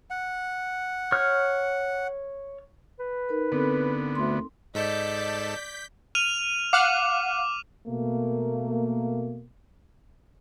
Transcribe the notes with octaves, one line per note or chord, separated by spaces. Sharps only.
F#5
C#5 F6
B4
D#4 A#4
D3 B3 C4 A4
D2 C6
G#2 A4 D5 D#5 A5 G6 B6
F6 D#7 F7
F5 F#5 D6 F6
B2 A3 A#3